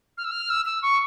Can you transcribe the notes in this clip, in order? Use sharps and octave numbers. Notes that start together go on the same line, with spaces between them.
F6
E6
F6
E6
E6
C#6